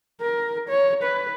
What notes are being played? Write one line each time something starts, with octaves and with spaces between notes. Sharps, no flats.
A#4
C#5
B4